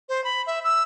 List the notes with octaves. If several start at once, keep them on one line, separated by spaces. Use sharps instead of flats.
C5
B5
E5
E6